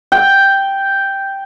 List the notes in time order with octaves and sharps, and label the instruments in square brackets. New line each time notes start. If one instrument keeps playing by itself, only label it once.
[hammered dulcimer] G5